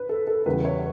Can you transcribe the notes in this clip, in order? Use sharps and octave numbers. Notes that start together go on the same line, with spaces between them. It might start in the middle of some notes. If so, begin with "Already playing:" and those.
Already playing: B4
A4
A4
E2 C#3 E3 G3 B4
C#5